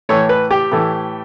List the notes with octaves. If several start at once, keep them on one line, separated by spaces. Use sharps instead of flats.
A2 E3 A3 C#5
B4
G4
A2 E3 A3